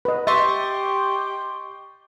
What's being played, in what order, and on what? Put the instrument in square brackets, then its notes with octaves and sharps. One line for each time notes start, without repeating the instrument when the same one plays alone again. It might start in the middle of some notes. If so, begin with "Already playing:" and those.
[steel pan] B4 D#5
[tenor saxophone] G4 [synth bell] D#5 [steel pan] E5 [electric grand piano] C6 C#6 A6